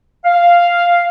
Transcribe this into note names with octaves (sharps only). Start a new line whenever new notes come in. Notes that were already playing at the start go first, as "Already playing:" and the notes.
F5